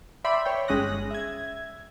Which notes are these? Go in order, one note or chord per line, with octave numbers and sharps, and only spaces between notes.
D5 E5 G5 B5 C6
C#5 G5
G1 G#3 C#4 D#6 F#6 A#6
E5 G#6